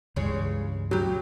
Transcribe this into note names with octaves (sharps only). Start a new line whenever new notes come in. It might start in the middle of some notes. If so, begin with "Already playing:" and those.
C#2 G2 C#3 E3 G#3 C#5
C#3 F#3 G4